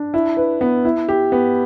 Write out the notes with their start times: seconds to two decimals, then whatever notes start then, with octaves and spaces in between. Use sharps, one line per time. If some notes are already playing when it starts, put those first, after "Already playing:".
Already playing: D4
0.14 E4
0.37 B4
0.61 B3
0.85 E4
1.08 G4
1.32 B3